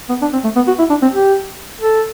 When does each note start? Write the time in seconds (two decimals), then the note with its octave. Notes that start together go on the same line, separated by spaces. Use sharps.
0.09 B3
0.22 D4
0.33 C4
0.44 A3
0.56 B3
0.68 F#4
0.79 E4
0.90 D4
1.02 C4
1.13 G4
1.81 A4